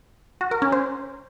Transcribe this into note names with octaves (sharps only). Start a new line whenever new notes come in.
F#4
A#4
C#4
C5